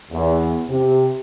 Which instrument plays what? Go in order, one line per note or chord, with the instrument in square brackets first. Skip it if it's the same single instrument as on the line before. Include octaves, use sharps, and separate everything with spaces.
[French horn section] E2
C3